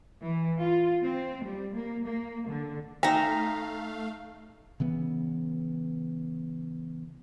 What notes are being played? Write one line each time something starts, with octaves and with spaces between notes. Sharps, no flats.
E3
F4
C4
G3
A#3
A#3
D3
A3 D#4 E5 F5 G5 A#5
C#3 E3 B3